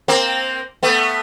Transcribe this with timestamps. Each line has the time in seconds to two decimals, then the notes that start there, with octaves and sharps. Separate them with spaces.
0.08 A#3 C4
0.83 A3 B3